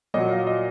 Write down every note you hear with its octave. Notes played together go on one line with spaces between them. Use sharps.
A#2 F#3 D#5
F5
D#5